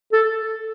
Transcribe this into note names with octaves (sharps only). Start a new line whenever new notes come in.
A4